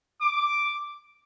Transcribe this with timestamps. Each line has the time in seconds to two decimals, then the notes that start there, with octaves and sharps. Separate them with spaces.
0.21 D6